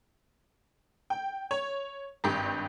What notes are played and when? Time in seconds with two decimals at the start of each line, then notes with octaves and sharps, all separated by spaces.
1.10 G5
1.51 C#5
2.24 G#1 G2 G4